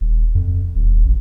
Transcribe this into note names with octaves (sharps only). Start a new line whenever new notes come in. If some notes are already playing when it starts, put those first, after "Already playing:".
D#1
F2
D#1
A1